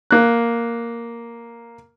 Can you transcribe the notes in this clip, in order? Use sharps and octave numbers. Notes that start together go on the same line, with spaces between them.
A#3 F#6